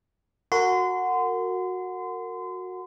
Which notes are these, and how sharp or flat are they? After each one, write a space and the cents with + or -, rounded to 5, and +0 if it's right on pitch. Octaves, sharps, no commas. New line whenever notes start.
F#4 -10 A#4 -30 C6 -30